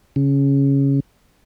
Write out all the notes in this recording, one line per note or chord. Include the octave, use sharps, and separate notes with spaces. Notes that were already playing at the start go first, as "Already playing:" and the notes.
C#3